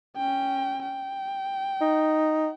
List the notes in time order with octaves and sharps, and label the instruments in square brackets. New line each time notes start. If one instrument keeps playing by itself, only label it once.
[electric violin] C#4 G5
G5
[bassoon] D#4